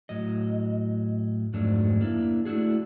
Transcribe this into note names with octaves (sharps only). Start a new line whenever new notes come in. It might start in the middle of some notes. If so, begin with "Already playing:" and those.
A2 F#3 D#5
F2 G#2 F#3 A3 D4
A#3 D4 E4
A3 D4 E4 F#4 G#4